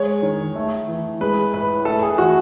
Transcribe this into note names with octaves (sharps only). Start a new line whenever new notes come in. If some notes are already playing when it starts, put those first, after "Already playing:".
Already playing: G#3 C#5
D#3
A3
E3
G#3 B4
A2 B4
A3 A4
G#4
E3 F#4